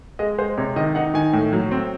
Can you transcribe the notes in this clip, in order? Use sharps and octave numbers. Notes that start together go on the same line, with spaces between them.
G#3 D#5
G#3 C5
C3 C#5
D#3 D#5
D#4 F#5
D#3 G#5
A2
F#3
C4